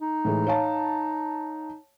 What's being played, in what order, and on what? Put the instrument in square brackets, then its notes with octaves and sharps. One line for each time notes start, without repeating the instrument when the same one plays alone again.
[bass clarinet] D#4
[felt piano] A2 E3 G#3
C#5 F5 A5